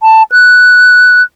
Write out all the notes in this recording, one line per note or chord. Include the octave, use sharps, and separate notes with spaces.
A5
F#6